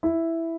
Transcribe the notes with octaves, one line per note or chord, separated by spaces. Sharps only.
E4